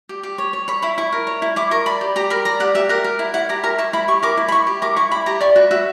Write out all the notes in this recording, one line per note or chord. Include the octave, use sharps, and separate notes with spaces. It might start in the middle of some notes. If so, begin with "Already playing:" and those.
G4
G4
C#5
C#5
C#5 B5
E4 B5
E4 C#6
A#4
C#5
E4
E4 D6
A#4 C#6
D5 B5
G4
G4 A#5
A#4 B5
D5 A#5
G4 F#5
G4 E5
A#4 F#5
A#4
E4
E4 F#5
G4 A#5
A#4 A#5
E4 C#6
E4 B5
G4 C#6
A#4 D6
E4
B5
E4 C#6
G4
A#4 D6
E4 C#6
E4 B5
G4 A#5
D5 C#6
F#4 B5
F#4 E5